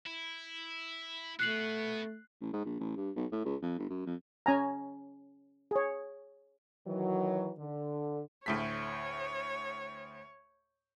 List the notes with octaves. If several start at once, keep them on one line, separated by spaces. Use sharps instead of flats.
E4
A3 B3 F#4 F#6 C7 F#7
A1
G#2
A#1
A1
G2
B1
A2
C#2
F2
G1
F#2
F2
C#4 G#5 A#5
G#4 C#5
D#3 E3 F#3
D3
D2 A2 C#5 B6